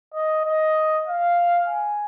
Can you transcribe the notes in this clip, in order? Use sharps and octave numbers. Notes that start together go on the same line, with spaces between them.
D#5
D#5
F5
G#5